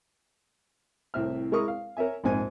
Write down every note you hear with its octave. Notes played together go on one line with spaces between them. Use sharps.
C2 A2 C4 E5 F6
G#3 E4 A#4 C#6 D#6
F5
A#4 C#5 E5 G#5
A#1 F2 G#2 G#5